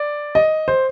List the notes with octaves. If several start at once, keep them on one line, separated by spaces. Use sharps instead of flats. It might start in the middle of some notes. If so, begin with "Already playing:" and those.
Already playing: D5
D#5
C5